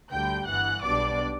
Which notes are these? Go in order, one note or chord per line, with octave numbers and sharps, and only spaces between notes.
D2 D3 G3 G5 G6
G1 G2 E3 F#5 F#6
B1 B2 G3 D4 D5 D6